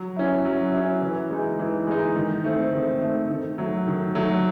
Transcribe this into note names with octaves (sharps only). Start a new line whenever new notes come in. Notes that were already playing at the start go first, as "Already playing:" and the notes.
Already playing: F#3
C#4 E4
F#3
C#4 E4
E3
G#3 D#4
E3
G#3 D#4
D#3
A3 C4
D#3
A3 C4
D#3
F#3 A3
D#3
F#3 A3